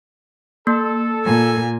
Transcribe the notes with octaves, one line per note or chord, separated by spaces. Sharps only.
A#3 A4
A#2 G#5